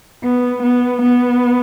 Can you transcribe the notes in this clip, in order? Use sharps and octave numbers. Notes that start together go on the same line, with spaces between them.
B3
B3
B3